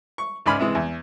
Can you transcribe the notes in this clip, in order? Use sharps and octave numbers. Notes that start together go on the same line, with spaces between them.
C#6
C#2 G#2 D5 G#5 B5 F6
C3 E3 G#3
E2